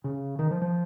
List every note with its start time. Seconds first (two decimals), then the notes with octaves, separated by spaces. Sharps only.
0.04 C#3
0.39 D#3
0.51 F3
0.62 F3